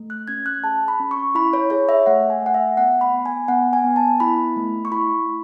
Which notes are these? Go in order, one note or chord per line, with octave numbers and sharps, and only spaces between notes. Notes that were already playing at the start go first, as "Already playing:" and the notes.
Already playing: A3
F#6
C#4 G#6
F#6
G#4 A5
B5
C#4
C#6
E4 B5
C#5
G#4 C#5
E5
A3 F#5
G#5
A3 F#5
E5
B3 F#5
B5
B3
G#5
B3 F#5
G#5
B3
A5
E4 B5
A3
C#6
E4 B5
E4